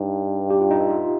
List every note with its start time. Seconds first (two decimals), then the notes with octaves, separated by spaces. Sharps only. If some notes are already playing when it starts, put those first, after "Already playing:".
Already playing: G2 D#4
0.50 G4
0.60 F4
0.71 D#4
0.80 F4
0.91 F4